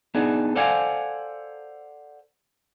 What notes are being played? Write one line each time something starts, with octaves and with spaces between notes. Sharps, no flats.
B3 D4 D#4 G#4
A4 C5 D5 F5 F#5 G#5